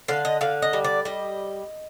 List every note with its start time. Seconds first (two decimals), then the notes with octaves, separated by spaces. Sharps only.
0.08 D3 F5
0.25 D#5
0.41 D3 F5
0.62 D#5
0.73 G3
0.84 D5
1.05 G3 D#5